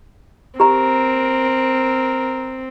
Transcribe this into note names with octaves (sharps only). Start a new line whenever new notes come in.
C4 G4 A#4 A#5